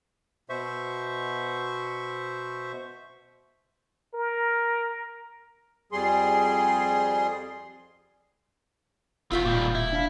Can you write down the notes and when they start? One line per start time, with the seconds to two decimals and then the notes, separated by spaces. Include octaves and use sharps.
0.49 B2 C5 E5 C#6
4.14 A#4
5.92 F2 G3 G#4 C6
9.32 E1 C4 F4 F#4 E5 G5
9.45 G2 A#2 D#3
9.75 E4
9.93 D4 F5